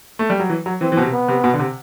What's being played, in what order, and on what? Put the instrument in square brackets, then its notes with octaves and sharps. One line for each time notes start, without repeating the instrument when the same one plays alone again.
[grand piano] A3
G3
F#3
E3
F#3
[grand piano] E3 [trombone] C4
[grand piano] E3
B2
C3
[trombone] B3
[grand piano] C3
B2
D3
C3